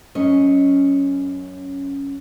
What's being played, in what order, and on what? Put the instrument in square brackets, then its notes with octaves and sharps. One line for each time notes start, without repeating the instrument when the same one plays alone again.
[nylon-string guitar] F#2 C#4 D#5